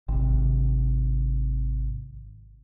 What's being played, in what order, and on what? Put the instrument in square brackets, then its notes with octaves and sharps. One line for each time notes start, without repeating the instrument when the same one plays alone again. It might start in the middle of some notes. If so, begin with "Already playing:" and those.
[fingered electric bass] G#1 C3